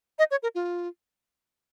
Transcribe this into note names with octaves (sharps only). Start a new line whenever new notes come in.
D#5
C#5
A#4
F4